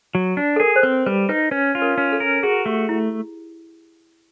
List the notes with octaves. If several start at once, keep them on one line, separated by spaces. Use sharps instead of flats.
F#3
D4
A4
G#4 A#4
C5
C4 B4
G3 B4
D#4 B4
C#4 B4
F4
A#4
C#4
A4
A#4
F#4 G#4
A3 G4
E4